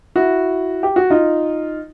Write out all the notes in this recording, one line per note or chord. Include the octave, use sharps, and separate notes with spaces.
E4 F#4
G4
F#4
D#4 F4